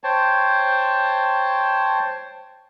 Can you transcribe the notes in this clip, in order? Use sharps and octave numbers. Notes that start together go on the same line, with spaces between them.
C5 C#5 G5 A5